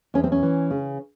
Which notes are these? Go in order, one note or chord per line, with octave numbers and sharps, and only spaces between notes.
E2 C#4
C4
C#4
E3
C#3